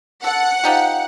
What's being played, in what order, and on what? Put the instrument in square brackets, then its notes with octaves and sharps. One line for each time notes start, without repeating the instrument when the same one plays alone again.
[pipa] A4 [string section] F#5
[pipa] F3 D#4 G4